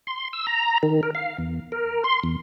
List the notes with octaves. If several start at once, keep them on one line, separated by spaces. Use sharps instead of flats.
C6
E6
A#5
D#3
A#4
F5
E2
A#4
C6
E2